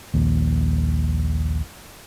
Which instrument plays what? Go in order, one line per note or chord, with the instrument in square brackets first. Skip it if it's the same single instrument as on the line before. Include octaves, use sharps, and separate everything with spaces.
[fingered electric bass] A#1 D#2